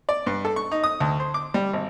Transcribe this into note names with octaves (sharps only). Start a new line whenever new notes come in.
D5
G2
A4
C#6
D#4
D#6
D2
C5
D6
G3
G#1